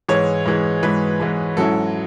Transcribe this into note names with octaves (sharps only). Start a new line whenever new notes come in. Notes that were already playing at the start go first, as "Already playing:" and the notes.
G#2 E3 G#3 C#5
G#2 E3 G#3
G#2 E3 G#3 B4
G#2 E3 G#3
G#2 F#3 C#4 E4 A4